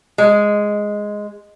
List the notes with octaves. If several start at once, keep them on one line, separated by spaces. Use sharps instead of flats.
G#3